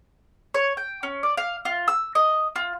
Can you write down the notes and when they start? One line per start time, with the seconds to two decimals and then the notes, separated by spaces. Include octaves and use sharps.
0.54 C#5
0.77 G5
1.03 C#4
1.23 D5
1.37 F5
1.65 F4
1.88 E6
2.15 D#5
2.56 F4